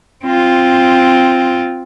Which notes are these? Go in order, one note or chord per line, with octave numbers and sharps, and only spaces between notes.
C4 F4